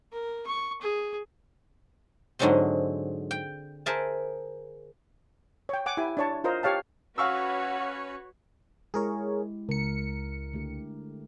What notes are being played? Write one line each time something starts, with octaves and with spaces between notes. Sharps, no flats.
A#4
C#6
G#4
G#2 D3 F#3 G#3 C4 C6
G5
G#4 A#4 C5 E5 A5
C#5 G5
F#5 G#5 D6
E4 G4 G#5
D4 C#5 A5
F4 A#4 C5 D#5 A#5
G4 C#5 F5 A5
C#4 F#4 B4 C#5 F5 F#5 C#6 E6
G#3 E4 G4 G#4 A#4 C#5
C#2 A#4 C#7
D3 A3 G4